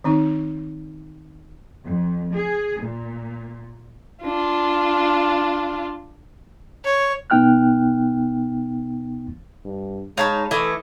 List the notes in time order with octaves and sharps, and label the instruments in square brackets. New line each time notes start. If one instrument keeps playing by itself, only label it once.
[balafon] D#3 C4 D#4
[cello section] F2
G#4
A#2
[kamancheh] D4 F4
[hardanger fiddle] C#5
[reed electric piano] B2 B3 D#4 G5 F6 F#6
[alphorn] G2
[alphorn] G#3 [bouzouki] D#4 C#5 [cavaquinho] F5 A5 B5
[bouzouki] E3 A3 [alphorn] A4 [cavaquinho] D#5 E5 D#6